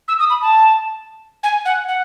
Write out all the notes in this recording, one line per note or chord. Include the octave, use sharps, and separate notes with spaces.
E6
D#6
B5
A5
G#5
F#5
F#5